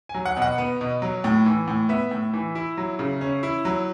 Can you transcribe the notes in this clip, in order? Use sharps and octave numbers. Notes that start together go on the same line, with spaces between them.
G#5
F#3
F#5
B2
F#5
B3
B2
F#3
A2
E3
A2
B3 E5
A2
E3
E4
F#3
C#3
C#4
E4
F#3